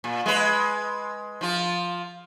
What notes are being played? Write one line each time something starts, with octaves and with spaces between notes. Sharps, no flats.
A#2
G#3 B4
F3 F4